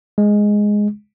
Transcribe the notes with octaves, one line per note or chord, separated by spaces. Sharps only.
G#3